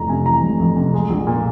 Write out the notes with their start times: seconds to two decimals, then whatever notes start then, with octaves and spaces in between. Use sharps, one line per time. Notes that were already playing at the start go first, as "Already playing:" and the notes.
Already playing: F1 F2 E3 A#5
0.09 C3 G#5
0.26 E3 A#5
0.42 F1
0.59 F2
0.76 C3
0.94 G#3
1.10 A#1
1.27 A#2